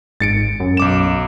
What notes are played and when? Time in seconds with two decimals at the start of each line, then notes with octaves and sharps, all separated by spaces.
0.20 G#1 A6 C#7 D7
0.60 F#2
0.77 B1 D6 E7